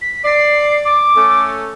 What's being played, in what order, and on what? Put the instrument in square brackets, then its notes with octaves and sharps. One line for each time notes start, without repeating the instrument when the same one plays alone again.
[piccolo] B6
[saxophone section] D5 [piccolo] C7
[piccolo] D6
[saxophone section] A3 C#4 A4